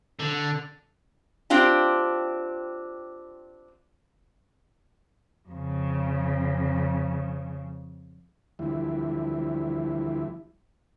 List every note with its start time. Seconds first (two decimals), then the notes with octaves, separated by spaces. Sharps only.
0.19 D3
1.50 C4 D4 F4 G4
5.49 F2 C#3
8.59 D2 E3 F3 G3 E4